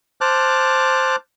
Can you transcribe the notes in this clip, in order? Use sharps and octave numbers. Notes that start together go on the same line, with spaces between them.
C5 A5 D6 F6 F#6